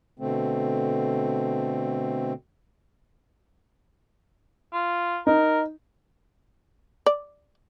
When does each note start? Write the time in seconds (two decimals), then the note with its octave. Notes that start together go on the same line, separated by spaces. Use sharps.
0.19 B2 D3 A3 C4
4.73 F4
5.27 D#4 A#4
7.06 D5